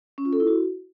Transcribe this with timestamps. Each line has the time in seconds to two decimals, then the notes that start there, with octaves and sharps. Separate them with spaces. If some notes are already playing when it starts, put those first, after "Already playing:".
0.18 C#4
0.25 F4
0.33 A4
0.40 E4
0.47 F#4